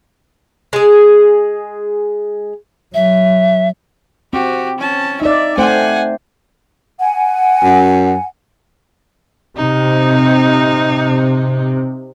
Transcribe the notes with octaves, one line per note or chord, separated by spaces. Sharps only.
G#3 G#4
F#3 E5
C4 F#4 G4
C#4 A5
D#4 D5 E5
A3 C4 C5 F#5 G#5
F#5 G#5
F#2
C3 D#4